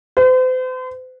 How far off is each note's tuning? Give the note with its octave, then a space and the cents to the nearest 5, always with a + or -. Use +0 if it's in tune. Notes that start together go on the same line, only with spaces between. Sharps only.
C5 -40